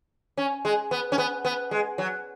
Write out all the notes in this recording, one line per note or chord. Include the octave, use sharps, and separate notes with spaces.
C#4
G#3
B3
C#4
B3
B3
G#3
F#3